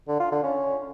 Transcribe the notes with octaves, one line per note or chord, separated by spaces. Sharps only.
D3
F4
D3
C#4